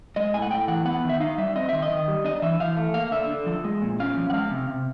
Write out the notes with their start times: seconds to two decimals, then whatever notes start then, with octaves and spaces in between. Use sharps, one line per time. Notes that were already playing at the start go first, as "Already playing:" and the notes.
0.16 G#3 D#5
0.34 A2 G#5
0.42 F#5
0.50 A2 G5
0.68 E3 F#5
0.85 B3 F#5
1.04 D#3
1.09 E5
1.20 D#4 F5
1.38 G3 E5
1.56 C4 D#5
1.69 D#3 E5
1.82 D#5
1.91 D#3
2.08 G3
2.24 D4 D#5
2.42 E3 E5
2.60 E3 F5
2.77 A3
2.94 A#3 F5
3.11 D3 E5
3.30 D3
3.46 F3
3.64 G#3
3.82 A#2
4.00 C#4 F5
4.17 F3
4.30 F#5
4.33 G#3 F5
4.51 C3
4.69 C3